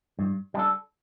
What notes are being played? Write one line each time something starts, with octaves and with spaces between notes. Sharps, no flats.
G2
G3 D4 A4